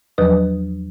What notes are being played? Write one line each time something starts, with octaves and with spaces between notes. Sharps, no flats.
E2 F3 F#3 B4 D#6